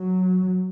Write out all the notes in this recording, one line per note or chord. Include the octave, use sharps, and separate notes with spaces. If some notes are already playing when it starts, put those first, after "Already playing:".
Already playing: F#3